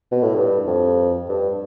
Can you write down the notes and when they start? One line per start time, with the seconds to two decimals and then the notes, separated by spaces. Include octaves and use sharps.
0.12 B2
0.23 A2
0.36 G2
0.67 F2
1.29 G2